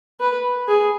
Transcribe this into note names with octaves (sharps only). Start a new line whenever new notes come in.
B4
G#4